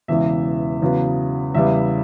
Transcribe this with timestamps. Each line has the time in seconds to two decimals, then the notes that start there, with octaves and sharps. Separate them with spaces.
0.08 E1 E2 C#3 E3 E5
0.82 E2 C#3 F#3 B3
1.54 E2 C#3 G3 B3 E5